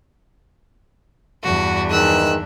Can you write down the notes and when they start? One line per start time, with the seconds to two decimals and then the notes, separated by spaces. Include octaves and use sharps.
1.44 E2 G2 D4 F#4
1.91 D#3 E3 G#3 E6 F#6